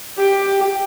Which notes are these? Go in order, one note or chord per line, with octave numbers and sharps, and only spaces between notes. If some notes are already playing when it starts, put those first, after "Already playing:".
G4